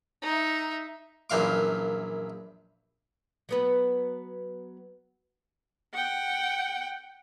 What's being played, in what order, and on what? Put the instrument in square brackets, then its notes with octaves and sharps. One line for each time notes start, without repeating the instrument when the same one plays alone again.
[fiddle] D#4 E5
[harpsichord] A#1 F#2 E3 F5 D6
[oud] F#3 B3 B4
[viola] F#5 G5